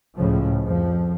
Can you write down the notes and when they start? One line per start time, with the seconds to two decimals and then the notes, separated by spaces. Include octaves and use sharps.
0.16 C#2 A2 C#3 F3
0.63 F2 F3